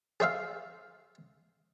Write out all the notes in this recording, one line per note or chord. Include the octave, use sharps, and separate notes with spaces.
G#4 C5 E5 F5